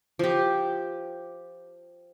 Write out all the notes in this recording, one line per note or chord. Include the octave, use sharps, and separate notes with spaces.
F3 G4